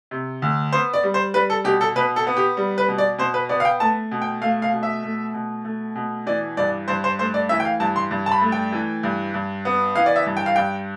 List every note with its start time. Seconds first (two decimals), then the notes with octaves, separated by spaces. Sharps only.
0.11 C3
0.42 D2
0.73 B3 C5
0.94 D5
1.03 G3
1.14 C5
1.34 G3 B4
1.50 A4
1.64 B2 G4
1.81 A4
1.96 B2 B4
2.16 A4
2.27 B3
2.37 G4
2.57 G3
2.78 B4
2.88 B2
2.98 D5
3.18 B2 C5
3.34 B4
3.49 B3 D5
3.60 F5
3.65 G5
3.80 A3 A5
4.11 B2
4.22 G5
4.42 A3 F5
4.62 F5
4.73 B2
4.83 E5
5.04 A3
5.34 B2
5.65 A3
5.96 B2
6.26 E3 D5
6.57 G2 D5
6.88 G2 C5
7.04 C5
7.19 A3 C5
7.34 D5
7.49 E3 E5
7.60 G5
7.65 F5
7.80 G2 A5
7.96 C6
8.11 G2
8.26 A5
8.32 B5
8.41 A3
8.52 G5
8.73 E3
9.03 G2
9.34 G2
9.65 B3
9.95 E3 F5
10.06 D5
10.16 E5
10.26 G2
10.37 G5
10.46 F5
10.56 G2 G5